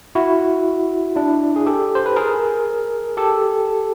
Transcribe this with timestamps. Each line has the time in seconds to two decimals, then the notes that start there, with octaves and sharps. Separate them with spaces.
0.15 E4 F#4
1.16 D4 E4
1.56 G#4
1.66 G4 A4
1.95 C5
2.06 B4
2.16 G#4 A#4
3.17 G4 A4